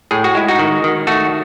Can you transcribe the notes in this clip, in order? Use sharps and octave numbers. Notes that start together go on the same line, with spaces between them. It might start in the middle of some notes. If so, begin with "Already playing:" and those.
A2 G#4
F#4
G#3 E4
D#4 F#4
D#3
D#3
A3 F#4 A4